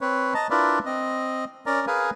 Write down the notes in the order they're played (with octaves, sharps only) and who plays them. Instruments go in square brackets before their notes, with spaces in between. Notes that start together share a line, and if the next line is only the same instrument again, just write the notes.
[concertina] C4 B4 C#5
D#5 A5 A#5
D4 E4 F4 A#4 B4 D5
C4 D#5
C#4 A#4 D5 A#5
G#4 A#4 B4 F5 G#5